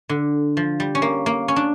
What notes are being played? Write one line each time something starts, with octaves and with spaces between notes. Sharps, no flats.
D3
F3
G3
C#4
A#3
A#3
C#4
D4